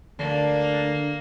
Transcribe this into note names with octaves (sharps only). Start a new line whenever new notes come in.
D2 D3 A#3 D4